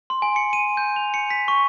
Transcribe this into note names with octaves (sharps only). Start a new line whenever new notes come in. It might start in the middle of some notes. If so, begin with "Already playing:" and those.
C6
G#5
C#7
D#7
G6
F7
C#7
B6
C#6